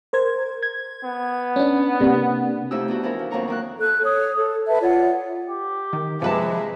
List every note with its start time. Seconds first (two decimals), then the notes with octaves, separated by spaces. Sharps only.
0.13 A#4 C5 G#6
0.63 G#6
1.04 B3
1.56 C#4 D4
2.01 C3 A#3 D4
2.71 F2 A3 D#4 E4 G4 E6
2.88 B3 D4 F#4
3.03 E3 F3 E4 A#4
3.19 F3
3.31 F2 D#3 F#3 A#3 A#5 C#6
3.48 D#3 A#3 F#6
3.81 A4 F#6
4.03 C#5 D#6
4.36 A4
4.67 B4 E5 A5
4.81 F4 C#5 D5 F#5
5.50 G4
5.93 D#3
6.22 C3 F3 G#3 B4 E5 A5